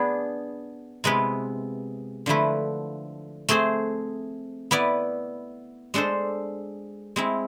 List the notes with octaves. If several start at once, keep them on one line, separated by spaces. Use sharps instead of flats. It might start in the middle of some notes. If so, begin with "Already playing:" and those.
Already playing: B3 D4 G#4
C3 G#3 B3 E4 B4
D3 F3 A3 E4 B4
A3 C4 G#4 C5
B3 E4 B4 D5
G#3 D4 A4 C5
G#3 C4 E4